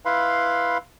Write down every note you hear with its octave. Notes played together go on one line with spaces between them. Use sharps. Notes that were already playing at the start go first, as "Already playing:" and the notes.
E4 B4 F5 B5 C6